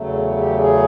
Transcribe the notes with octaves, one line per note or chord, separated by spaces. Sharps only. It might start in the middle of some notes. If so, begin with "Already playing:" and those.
Already playing: E2 C#3 F#3 A3
G4
G#4